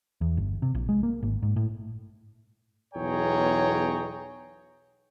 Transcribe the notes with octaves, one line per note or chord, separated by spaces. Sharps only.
E2
G1
C3
A#1
G#3
A#3
G#1
G#2
A2
B1 E2 G#4 C#5 G5 A#5